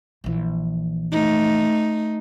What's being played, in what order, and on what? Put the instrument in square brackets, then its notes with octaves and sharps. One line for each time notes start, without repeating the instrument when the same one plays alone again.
[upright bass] A#1 E3
[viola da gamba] A3 D#4